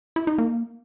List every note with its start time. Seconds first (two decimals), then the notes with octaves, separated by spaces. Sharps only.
0.16 E4
0.27 D#4
0.38 A#3